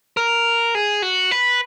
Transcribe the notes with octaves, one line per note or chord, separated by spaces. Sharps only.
A#4
G#4
F#4
B4